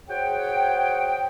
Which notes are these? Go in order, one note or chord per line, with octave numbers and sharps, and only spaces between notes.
F#4 G#4 C5 C#5 F#5 G5